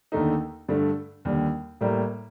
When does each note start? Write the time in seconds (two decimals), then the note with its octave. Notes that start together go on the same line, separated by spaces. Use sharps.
0.12 D#2 D3 A3 D#4
0.68 G2 D3 A3
1.25 D#2 D3 G3
1.81 A2 G3 A#3